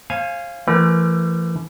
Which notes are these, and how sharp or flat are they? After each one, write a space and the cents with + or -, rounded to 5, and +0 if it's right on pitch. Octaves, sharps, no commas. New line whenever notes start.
C5 +45 F5 -15 G#5 +0
E3 +35 A3 +25 A#4 +45